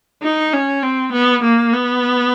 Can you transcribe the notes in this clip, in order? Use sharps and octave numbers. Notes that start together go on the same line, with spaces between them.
D#4
C#4
C4
B3
A#3
B3